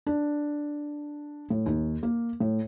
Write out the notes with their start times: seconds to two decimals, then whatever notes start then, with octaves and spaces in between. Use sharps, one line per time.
0.07 D4
1.50 A2
1.66 D#2
2.03 A#3
2.40 A2